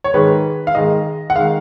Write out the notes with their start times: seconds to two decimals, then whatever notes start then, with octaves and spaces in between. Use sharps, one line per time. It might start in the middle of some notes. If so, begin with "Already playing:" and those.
0.04 C#5
0.14 G#2 D#3 G#3 B4
0.67 F5
0.75 G#2 D#3 G#3 D#5
1.30 F#5
1.36 D#3 G#3 F5